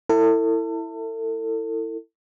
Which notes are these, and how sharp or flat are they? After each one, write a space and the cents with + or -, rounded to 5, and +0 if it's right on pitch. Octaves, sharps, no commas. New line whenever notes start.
E4 +0 A4 +35